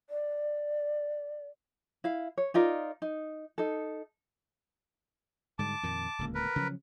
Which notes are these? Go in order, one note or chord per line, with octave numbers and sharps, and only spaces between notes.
D5
E4 F5
C#5
D#4 F4 A#4 D5
D#4
D#4 A4
G#2 D3 G3 A5 D6
F2 A#2 D#3
D1 C#2 A#3
A#4 B4
C#3 F3 F#3